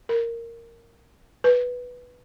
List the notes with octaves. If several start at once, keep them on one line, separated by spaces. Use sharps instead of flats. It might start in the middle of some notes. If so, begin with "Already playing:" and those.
A#4
B4